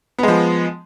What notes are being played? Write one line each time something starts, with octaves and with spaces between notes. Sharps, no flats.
F3 G#3 B3